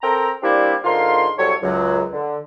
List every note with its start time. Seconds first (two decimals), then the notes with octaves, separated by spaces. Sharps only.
0.02 C4 A4 A#4 G5 A#5
0.42 G3 A#3 C4 D4 E4 G4
0.84 G#2 D3 F4 A#4 F5 C6
1.37 C2 F#3 G3 A4 C#5
1.63 C#2 F#2 F#3
2.12 D3